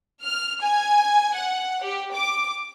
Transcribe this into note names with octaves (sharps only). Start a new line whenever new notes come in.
F6
G#5
F#5
G4
D6